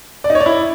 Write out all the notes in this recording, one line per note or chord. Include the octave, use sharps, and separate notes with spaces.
D5
D#4
C#5
D5
E4